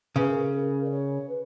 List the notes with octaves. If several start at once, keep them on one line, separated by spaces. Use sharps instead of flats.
C#3 B4
A#4
G4
A#4
D5
C#5
B4